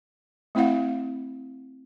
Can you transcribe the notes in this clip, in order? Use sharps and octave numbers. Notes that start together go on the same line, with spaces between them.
A3 C4 E4 F5 F#5